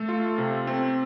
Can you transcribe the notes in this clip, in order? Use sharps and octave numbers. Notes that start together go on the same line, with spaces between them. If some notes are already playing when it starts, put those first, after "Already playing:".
Already playing: A3 A4
F4
C3
C4